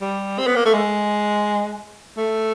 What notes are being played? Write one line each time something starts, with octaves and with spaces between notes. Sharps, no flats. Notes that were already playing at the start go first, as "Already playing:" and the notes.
G3
C4
B3
A#3
A3
G#3
A3